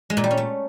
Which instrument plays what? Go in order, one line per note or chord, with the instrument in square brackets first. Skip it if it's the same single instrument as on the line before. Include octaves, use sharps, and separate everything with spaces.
[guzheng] G#3
A#2
G3
C#4
A3